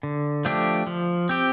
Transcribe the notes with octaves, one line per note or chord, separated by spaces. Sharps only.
D3
F3 A3 D4 G4
F3
C4 G4